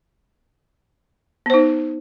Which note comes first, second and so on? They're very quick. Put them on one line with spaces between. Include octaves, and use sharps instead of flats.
B3 C5 D#4